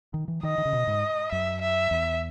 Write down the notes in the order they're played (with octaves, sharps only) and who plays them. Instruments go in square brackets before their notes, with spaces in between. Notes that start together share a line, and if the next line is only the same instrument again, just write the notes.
[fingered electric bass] D#3
E3
[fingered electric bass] D#3 [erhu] D#5
[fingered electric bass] D#3
C#3
B2
G#2
[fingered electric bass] F#2 [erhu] E5
[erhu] E5
[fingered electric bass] E2